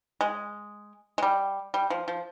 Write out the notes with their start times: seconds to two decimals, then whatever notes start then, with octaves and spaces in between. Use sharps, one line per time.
0.21 G#3
1.18 G#3
1.23 G3
1.74 G3
1.90 F3
2.08 F3